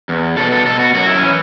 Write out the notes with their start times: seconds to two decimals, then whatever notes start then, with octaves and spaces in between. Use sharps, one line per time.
0.09 E2
0.37 B2 A4
0.52 A4
0.66 B2 A4
0.80 F#4
0.95 F#2 F#4
1.06 E4
1.17 C#4
1.23 E3